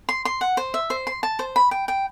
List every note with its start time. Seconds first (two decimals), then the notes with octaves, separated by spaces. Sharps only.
0.09 C6
0.25 C6
0.41 F#5
0.57 C5
0.74 E5
0.90 C5
1.07 C6
1.23 A5
1.39 C5
1.56 B5
1.71 G5
1.88 G5